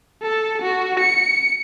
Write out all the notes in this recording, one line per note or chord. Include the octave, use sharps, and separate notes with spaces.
A4
F#4
C#7